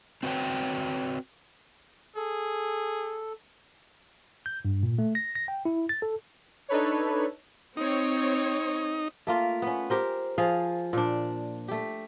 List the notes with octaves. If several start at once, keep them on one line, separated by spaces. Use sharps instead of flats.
C4 F#4 B4 C#5 G5
G#4 A4
G6
G2
A#2
A3
A#6
A#6
G5
E4
A6
A4
D4 D#4 A4 B4 C#5
C4 D#4 C#5
A3 A#3 F4
B3 C#4
G4 A#4 C5
F3 G#4 F5
A#2 D4
A3 G4